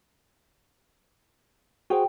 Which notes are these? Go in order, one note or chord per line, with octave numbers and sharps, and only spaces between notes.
F#4 G#4 C5 G5